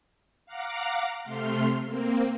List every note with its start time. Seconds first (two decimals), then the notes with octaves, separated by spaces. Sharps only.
0.46 F5 F#5 A#5 D6
1.22 C3 A3 C6 F6
1.86 A#3 C4